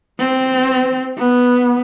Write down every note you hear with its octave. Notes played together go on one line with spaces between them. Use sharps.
C4
B3